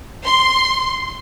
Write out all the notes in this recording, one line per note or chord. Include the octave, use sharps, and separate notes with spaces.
C6